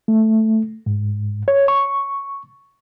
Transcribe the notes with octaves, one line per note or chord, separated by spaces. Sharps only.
A3
G#2
C#5
C#6